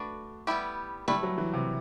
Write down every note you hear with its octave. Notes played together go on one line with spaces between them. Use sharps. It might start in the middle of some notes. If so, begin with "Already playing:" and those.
Already playing: A3 D4 F#4 B4 D5
G3 B3 E4 G4
G3 A3 E4 B4
F#3
E3
C3